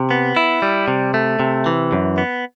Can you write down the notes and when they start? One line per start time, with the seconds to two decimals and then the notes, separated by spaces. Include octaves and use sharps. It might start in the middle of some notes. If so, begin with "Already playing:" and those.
Already playing: C3
0.11 B3
0.36 E4
0.62 G3
0.88 C3
1.14 A3
1.40 C3
1.66 E3
1.92 F#2
2.18 B3